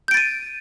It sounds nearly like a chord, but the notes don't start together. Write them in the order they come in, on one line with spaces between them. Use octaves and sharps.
G6 D7 A6 D#7